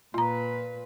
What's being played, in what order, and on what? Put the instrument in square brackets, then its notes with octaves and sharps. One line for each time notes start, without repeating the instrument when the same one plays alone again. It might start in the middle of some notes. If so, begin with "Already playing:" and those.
[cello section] A#2 B4 [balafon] F4 A#5